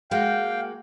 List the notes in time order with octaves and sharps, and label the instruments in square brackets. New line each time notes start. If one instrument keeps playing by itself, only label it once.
[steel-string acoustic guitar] G#3 A#3 F#4 [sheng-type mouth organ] F5 G5